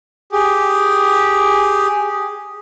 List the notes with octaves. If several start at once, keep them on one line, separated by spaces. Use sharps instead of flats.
G4 G#4